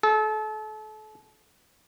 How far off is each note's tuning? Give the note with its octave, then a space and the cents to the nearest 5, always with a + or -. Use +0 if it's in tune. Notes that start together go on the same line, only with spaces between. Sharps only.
A4 -35